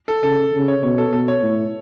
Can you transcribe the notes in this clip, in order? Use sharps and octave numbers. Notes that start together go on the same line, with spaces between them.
A4
C#3 A4
C#3
C#5
B2 C#5
A4
B2 A4
C#5
A2